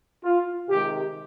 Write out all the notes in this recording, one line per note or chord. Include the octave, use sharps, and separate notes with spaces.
F4
C3 D#3 G#3 G4